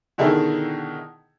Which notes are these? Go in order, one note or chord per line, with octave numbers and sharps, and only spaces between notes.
B2 D3 D#3 E4 G#4 A4